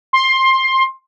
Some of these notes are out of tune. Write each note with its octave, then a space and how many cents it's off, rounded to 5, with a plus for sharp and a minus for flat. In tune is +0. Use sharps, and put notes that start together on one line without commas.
C6 +15